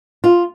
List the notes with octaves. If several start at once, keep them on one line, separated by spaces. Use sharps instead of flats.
F4